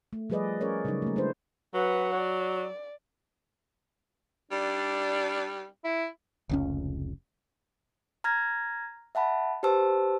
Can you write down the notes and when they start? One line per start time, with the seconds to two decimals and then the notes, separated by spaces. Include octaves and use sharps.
0.13 A3
0.30 F3 G3 G#4 B4 D5 D#5
0.61 C#4 G#4 A#4 C#5 D5
0.85 C#3 F#3 G3 C#4 D#4
1.02 A3 A#3
1.16 G#3 D4 E4 B4 C5
1.74 F#3 B4 F#5
2.14 D5
4.51 G3 D4
5.84 E4
6.49 F1 C#2 C#4
8.24 A#5 F6 G#6 A#6
9.15 E5 F#5 A5 B5
9.63 G4 B4 C5 A5 E6